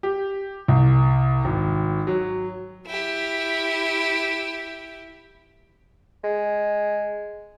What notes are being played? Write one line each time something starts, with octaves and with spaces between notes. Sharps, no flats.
G4
C2
G#1
F#3
E4 G4
G#3